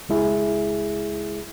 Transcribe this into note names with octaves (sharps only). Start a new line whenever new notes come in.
C#2 G#3 E4 G#4